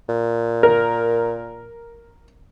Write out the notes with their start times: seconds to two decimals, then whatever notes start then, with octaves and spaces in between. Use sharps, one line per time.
0.09 A#2
0.63 A#4